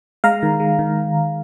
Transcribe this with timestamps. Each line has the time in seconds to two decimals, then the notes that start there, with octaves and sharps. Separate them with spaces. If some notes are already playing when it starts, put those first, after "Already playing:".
0.24 G#3 F5 A#5
0.43 D#3
0.60 G#3
0.79 D#3